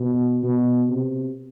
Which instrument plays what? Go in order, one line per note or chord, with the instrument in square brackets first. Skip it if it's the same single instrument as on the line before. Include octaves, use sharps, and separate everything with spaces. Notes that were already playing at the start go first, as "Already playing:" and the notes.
Already playing: [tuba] B2
B2
C3